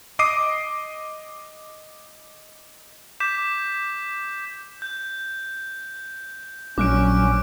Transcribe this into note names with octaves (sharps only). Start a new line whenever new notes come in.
D#5 D6 D#6 C7 D#7
D6 G6 B6 E7
G6
A#1 F#3 C#4 D6 F#6 D7